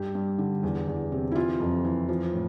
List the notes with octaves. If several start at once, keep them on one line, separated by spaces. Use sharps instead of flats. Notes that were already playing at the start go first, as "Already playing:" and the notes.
Already playing: G2 G4
G2
D3
E2
E2
C3
E4
E3 F4
F2
E3
F3
A2